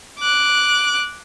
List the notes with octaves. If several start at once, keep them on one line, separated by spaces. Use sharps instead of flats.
D6 F#6